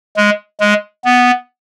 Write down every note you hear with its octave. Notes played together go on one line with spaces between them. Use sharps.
G#3
G#3
B3